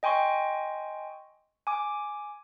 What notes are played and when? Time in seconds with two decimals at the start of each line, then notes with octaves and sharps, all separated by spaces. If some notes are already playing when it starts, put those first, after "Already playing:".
0.03 D#5 G5 G#5 C6 C#6
1.67 G#5 D6